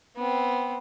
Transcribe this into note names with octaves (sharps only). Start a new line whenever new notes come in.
B3 C4